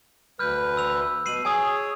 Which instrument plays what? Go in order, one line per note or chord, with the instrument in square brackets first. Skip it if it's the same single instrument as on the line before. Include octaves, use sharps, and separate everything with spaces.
[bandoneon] D2 B4 [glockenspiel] F6 G6
[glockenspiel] E6 F7
[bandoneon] B2 [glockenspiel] C7 D#7 F#7
[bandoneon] G#4 C#5 [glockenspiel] G#5 D#6